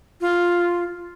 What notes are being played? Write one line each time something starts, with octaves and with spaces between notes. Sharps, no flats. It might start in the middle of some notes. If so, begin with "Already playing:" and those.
F4